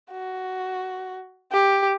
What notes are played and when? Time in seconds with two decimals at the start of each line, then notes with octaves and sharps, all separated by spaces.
0.11 F#4
1.52 G4